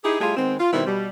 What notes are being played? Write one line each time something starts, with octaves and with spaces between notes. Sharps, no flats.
D#4 E4 G4 G#4
G3 A3 E4 F4 G4 G#4
D#3 G#3 B3 C4
F4
B2 D#3 G3 C4 E4
B2 G3